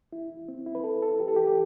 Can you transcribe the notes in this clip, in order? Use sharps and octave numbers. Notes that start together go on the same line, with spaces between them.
E4
C4
E4
B4
A4
A4
G4
A4
G4
G4